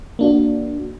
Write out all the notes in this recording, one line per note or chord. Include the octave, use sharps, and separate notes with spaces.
A#3 D4 F#4